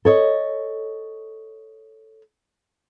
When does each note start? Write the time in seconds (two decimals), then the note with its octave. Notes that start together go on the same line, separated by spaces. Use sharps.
0.05 A4 C#5 D#5